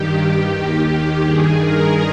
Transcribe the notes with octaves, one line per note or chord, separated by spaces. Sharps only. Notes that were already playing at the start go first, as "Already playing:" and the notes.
Already playing: G2 D#3 G4
D#2 D#3
G2 D#3 G#4
A#4